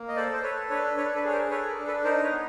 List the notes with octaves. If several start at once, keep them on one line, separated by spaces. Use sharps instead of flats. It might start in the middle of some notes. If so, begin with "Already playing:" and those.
Already playing: A#3
D#5
A4 C5 D5
C5
A4 B4 C#5
D4 B4 C#5
D4 B4 C#5
A4 B4
G#4 C#5
A#4 C5
A4 B4 C#5
A#4
D4
A4 B4
D#4 A#4 C5
B4 C#5
B3